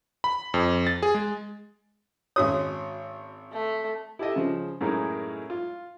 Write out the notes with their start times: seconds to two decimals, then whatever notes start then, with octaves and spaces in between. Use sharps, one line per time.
0.24 B5
0.54 F2
0.87 A6
1.03 G#4
1.15 G#3
2.36 G#1 C#4 F#4 C#5 D#6
3.52 A3
4.19 E4 G4 A4 D#5 E5
4.36 C#3 F3
4.81 F#2 A2 G#3 A#3 D#4
5.50 F4